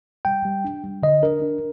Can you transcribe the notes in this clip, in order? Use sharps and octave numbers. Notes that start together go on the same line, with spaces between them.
G3 G5
G3
D4
G3
D3 D#5
D4 A#4
D4